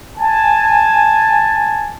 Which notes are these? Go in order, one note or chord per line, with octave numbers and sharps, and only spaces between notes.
G#5 A5